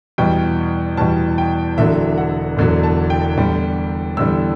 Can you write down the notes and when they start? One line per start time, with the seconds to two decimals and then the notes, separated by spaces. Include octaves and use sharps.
0.18 E2 B2 G3 G5
0.97 E2 B2 G3 A5
1.38 G5
1.78 E1 E2 D3 F#3 E5
2.18 F#5
2.57 E1 E2 D3 F#3
2.83 A5
3.10 G5
3.37 E2 D3 G3
4.17 E2 D3 G3 E6